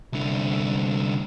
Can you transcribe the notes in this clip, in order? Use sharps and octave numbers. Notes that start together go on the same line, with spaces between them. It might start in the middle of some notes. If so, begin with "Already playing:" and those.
C2 D3